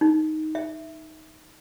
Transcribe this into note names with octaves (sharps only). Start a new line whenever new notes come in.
D#4
E5